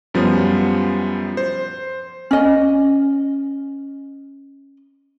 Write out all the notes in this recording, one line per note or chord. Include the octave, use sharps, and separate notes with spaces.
F#2 F3 G3 B3 C#4
C5
C#4 D#5